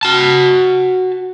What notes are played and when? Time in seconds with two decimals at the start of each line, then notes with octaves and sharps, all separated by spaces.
0.03 F#4 A5